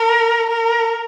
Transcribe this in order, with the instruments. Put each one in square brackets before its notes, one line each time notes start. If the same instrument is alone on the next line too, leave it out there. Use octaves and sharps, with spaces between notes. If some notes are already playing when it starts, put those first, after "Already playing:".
Already playing: [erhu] A#4
A#4